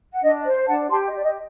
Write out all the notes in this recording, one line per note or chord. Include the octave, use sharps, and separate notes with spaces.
F#5
D4 D#5
C5
D4 F#5 A5
G4 A5 C6
D#5
G4 D5
D#5